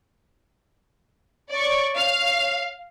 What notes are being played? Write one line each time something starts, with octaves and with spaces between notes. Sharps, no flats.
C#5 D5 C#6
F5